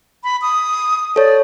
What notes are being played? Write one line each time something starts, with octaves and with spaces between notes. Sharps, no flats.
B5
D#6
A4 C#5 D5